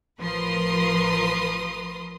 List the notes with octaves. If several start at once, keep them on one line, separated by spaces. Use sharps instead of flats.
A1 F3 A#4 B4 C6 D#6